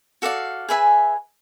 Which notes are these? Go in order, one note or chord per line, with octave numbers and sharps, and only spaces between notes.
F#4 A4 D5 F5
G#4 B4 E5 G#5